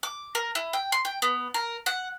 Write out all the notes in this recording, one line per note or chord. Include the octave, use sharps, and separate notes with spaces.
D6
A#4
E4
G5
C6
G5
B3
A#4
F#5